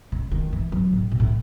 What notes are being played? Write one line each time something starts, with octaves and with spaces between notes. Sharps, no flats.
C#3
D#3
E3
F#3
A2
B2
A2